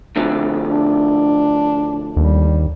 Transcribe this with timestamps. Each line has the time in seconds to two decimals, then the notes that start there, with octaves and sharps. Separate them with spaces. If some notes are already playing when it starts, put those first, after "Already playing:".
0.16 A2 D3 F3
0.68 D4
2.17 D#2 G3